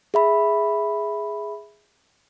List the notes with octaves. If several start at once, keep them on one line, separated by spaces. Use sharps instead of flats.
G#4 E5 B5